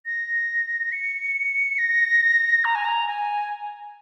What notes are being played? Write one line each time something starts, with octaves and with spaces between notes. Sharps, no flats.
A#6
C#7
A#6
A#5
G#5
A#5
G#5